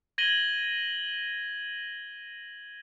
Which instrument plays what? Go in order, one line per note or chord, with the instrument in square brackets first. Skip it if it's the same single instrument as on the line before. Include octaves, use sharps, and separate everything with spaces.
[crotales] G#6 A#6 D#7 F#7 G7